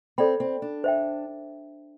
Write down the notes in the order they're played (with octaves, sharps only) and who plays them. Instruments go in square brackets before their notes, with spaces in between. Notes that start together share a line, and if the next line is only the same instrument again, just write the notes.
[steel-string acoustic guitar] C4 [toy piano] A4 D5 G5 B5
[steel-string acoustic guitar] C4
D4
[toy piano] C5 E5 G5